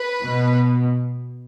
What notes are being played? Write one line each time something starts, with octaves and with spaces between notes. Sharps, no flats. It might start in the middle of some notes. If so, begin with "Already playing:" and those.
Already playing: B4
B2